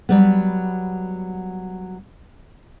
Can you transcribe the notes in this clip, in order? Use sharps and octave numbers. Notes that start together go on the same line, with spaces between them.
F#3 G3 B3